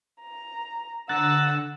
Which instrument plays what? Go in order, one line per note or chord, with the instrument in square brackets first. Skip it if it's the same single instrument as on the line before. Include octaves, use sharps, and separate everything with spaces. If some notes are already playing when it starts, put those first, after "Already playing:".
[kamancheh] A#5
[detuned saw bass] D3 [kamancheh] F#5 E6 [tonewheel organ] A#5 F#6 A6